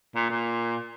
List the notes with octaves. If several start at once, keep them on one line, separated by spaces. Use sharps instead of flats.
A#2
A#2